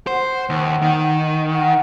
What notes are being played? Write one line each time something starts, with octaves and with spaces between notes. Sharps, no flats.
C5 F#5
D#2
D#3
F#5